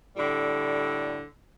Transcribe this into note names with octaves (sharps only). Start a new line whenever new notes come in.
A2 D3 G3